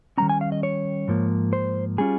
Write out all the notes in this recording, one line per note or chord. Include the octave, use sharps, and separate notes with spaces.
D#3 G3 C#4 A#5
G#5
F5
D#5
C#5
G#2 F3 A#3
C5
G3 C#4 F4 G#4